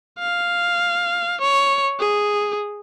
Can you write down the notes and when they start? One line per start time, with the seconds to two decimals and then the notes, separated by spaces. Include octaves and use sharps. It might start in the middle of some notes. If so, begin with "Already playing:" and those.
0.19 F5
1.42 C#5
2.00 G#4